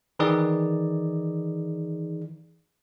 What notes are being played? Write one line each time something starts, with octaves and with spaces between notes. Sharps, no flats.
D#3 E3 D#4 G#4 D5